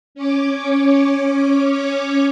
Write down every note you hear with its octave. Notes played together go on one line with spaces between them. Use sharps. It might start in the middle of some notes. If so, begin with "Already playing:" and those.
C#4 C#5 D6